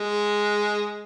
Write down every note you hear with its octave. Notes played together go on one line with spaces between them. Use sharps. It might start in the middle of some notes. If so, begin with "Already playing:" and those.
Already playing: G#3